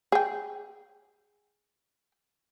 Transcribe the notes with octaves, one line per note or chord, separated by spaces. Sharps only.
G#4 G5